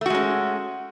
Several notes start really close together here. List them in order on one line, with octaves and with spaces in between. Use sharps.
A3 F#4 G#3 C#4